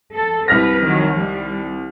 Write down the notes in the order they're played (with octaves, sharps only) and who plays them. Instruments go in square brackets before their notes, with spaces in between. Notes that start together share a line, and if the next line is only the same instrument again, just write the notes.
[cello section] A4
[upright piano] C2 F6 A#6 [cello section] B4
[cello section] D#3 F#3
G3